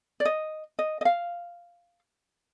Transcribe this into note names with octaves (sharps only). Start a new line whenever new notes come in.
D5
D#5
D#5
D#5
F5